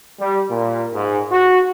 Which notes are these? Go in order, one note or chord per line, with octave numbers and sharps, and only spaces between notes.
G3
A#2
G#2
F#4